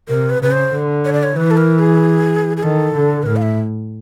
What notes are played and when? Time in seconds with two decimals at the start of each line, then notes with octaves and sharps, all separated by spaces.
0.09 C3 A#4
0.30 B4
0.41 C#3 B4
0.52 C5
0.73 D3
1.05 C#5
1.13 D5
1.23 C#5
1.36 E3 B4
1.51 A4
1.57 A#4
1.79 G#4
2.57 G#4
2.63 D#3 A4
2.95 D3
3.23 B4
3.26 A2 A#4
3.36 F5
3.42 E5